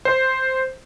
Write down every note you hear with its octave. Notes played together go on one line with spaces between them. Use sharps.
C5